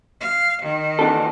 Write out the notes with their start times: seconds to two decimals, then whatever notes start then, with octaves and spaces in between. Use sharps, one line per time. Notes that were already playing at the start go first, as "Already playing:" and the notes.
0.21 F5
0.63 D#3
0.99 E2 D4 A4